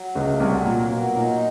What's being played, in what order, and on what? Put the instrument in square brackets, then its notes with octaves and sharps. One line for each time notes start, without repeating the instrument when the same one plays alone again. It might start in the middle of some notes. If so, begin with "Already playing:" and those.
Already playing: [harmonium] F#3
[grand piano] C#2 C#3 [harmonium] A3
[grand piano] C2 C3 [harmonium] F#3
[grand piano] A#2 [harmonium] A#3
[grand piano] B2 [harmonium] F#3
[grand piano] A#2 [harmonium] D#4